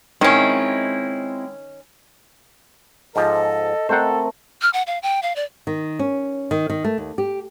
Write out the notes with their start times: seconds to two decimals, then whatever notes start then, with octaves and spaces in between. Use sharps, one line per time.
0.21 D#3 G#3 C4 C#4 E4
3.16 G#2 F3 A4 D#5
3.89 A3 C4 A4 A#4 C5 F#5
4.62 F6
4.73 F#5
4.87 F5
5.03 G5
5.23 F5
5.36 D5
5.67 D#3
5.99 C#4
6.51 D#3
6.70 D#3
6.84 A3
6.98 D#2
7.18 G4